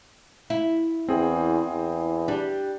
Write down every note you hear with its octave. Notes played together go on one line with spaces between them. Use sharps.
E4
E2 C4 G#4
E2
G3 D4